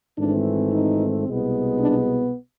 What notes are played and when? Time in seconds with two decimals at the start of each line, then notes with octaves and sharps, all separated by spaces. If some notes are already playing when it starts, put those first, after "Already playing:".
0.18 G#1 G#2 E3 A3 C4 D4
0.73 D#4
1.26 C2 B2 G#3 B3
1.79 D4